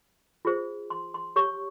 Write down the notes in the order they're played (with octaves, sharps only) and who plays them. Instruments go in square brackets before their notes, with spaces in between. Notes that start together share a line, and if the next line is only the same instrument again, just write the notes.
[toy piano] F4 G#4 C5
C6
C6
G4 C#5 C#6